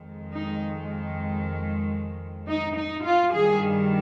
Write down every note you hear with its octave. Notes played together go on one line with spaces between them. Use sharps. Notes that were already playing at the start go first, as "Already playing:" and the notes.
Already playing: F2 D#3 G#3
D#4
D#4
D#4
F4
G2 D#3 G3 G#4